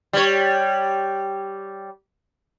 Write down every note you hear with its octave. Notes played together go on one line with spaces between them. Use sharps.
G3 C#5